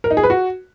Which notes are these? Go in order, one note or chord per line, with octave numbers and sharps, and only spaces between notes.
A#4
D#4
G#4
B4
F#4